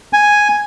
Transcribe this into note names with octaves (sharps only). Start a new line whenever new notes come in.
G#5